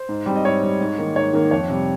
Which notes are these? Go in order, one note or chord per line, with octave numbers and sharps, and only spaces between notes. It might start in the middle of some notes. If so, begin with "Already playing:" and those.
Already playing: C5
G#2
G3 C4
D#5
G#2 C#5
G3 C4
G#2
D#3 A#3
G#2 C#5
D#3 A#3
F2 C#5
C3 G3